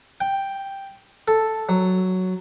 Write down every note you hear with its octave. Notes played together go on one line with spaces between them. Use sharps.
G5
A4
F#3